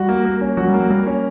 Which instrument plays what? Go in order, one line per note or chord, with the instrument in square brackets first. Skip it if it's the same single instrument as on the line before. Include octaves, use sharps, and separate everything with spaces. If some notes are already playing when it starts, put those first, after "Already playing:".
Already playing: [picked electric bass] G3 [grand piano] F#4
[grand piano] A#3
A#3
C#4
[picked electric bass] F#3 [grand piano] F#4
[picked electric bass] G3
[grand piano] A#3
[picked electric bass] F#3
[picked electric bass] G3 [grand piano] A#3
[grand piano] C#4